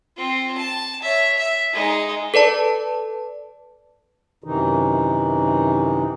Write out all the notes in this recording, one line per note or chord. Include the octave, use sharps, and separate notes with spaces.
C4 F4
A5
C#5 E5
E5
G#3 D#4
A4 B4 D5 A5
F#2 C3 D#3 E3 D#4